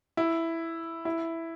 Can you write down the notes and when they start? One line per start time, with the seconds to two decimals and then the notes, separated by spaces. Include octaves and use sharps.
0.17 E4
1.05 E4